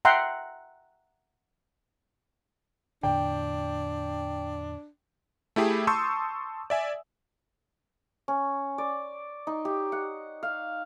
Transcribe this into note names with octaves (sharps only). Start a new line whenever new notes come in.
E5 F#5 G5 A#5 C6
E2 A2 D3 D4 G5
A3 E4 G4 G#4
A5 C6 C#6 D#6 E6 G6
D5 E5 G#5
C#4
D5
D#4
G4
F#5
F5